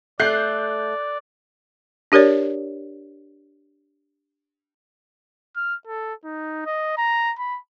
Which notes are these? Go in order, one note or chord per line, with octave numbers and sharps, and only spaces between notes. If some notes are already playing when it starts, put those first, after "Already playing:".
A3 D5 F#6 G6 C7
D4 G4 A#4 C#5 D5
F6
A4
D#4
D#5
A#5
B5